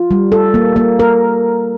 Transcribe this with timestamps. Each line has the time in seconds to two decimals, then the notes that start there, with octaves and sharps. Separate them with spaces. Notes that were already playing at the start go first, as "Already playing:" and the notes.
Already playing: F4
0.11 G3
0.32 A4
0.54 A#3
0.76 A#3
0.99 A#4